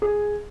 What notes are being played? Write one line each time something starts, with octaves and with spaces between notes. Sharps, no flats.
G#4